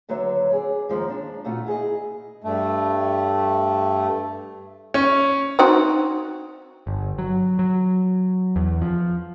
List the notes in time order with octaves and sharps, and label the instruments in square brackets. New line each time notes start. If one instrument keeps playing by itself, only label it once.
[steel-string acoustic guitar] D#2 D3 F#3 B4 C#5 E5
G#4 D5
D#2 D#3 F3 G#3
D4
A#2 A3 F4 F#4
E4 G#4 B4 D#5
[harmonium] G2 A3
[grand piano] C#4
[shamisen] C4 D#4 F#4
[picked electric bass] G1
F#3
F#3
E2
F3